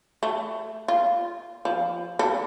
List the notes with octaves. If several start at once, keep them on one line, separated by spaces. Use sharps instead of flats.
A3
F4
F3
A4